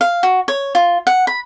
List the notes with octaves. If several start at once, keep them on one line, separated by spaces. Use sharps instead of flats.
F5
F#4
C#5
F4
F#5
B5